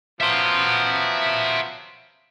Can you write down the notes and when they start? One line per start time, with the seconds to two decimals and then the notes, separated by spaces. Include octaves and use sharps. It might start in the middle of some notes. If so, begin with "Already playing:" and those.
0.21 F3 F#3 B3 E5 C6